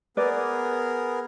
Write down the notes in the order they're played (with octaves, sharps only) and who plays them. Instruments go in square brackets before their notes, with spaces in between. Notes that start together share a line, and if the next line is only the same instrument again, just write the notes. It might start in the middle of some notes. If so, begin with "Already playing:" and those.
[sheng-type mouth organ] B3 G#4 A#4 [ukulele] B4 D5